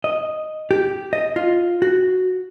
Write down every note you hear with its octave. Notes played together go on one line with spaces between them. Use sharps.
D#5
G4
D#5
F4
F#4